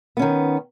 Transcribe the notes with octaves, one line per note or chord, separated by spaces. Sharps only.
D#3 B3 C#4